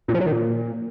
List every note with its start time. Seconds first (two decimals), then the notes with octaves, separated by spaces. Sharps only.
0.08 A#2
0.14 F3
0.20 F#3
0.26 D#3
0.32 A#2